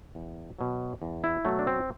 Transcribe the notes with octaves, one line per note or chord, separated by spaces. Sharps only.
E2
B2 F#3
E2
E4
B2 F#3 A3
D4
C4